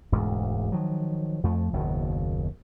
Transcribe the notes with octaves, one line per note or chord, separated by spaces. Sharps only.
E1 D2 G#2
D#3 F3 F#3
F2 F3 A3
F#1 D#2 B2